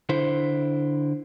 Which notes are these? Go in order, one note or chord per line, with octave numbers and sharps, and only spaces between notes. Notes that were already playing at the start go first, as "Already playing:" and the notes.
D3 E4 C5